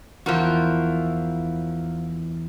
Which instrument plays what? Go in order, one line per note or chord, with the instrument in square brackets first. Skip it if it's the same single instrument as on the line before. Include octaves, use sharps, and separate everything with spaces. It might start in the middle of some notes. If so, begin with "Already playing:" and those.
[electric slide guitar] E2 E4 A#4 [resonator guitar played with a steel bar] F3 F#4